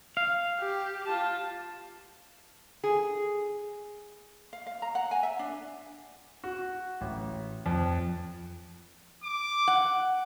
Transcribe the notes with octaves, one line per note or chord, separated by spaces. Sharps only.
F5
G4
F4 A5
G#4
F5
F5
A#5
F#5
G#5
E5
D4
F#4
A1
F2
D6
F#5